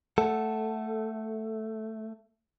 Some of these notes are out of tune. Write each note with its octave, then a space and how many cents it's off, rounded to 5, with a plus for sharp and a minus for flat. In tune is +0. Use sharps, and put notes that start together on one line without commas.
A3 +0 A4 +0 F#5 +5